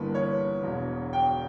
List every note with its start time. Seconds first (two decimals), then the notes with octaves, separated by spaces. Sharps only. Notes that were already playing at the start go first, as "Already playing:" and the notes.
Already playing: G1 G2 E3 A#3 B4
0.15 C#5
0.63 E1 E2 B2
1.13 G5